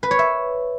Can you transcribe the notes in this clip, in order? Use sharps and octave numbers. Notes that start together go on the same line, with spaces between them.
B4
C#5
E5